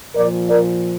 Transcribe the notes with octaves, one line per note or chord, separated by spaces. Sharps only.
A#2 F3 A#4 D5
A#4 D5